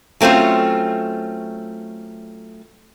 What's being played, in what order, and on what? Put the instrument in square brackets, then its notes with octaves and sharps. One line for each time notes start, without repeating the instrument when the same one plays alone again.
[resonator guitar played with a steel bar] F#3 A3 C4 C#4 F4